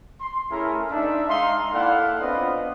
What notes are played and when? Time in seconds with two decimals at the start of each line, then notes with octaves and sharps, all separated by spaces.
0.21 C6
0.50 A3 C#4 E4 G#4 A#4
0.91 D4 D#4 E5
1.28 G#3 D#4 F5 C6
1.72 A#3 E4 A4 D5 F5 F#5
2.20 B3 C4 D4 F4 B4 D#5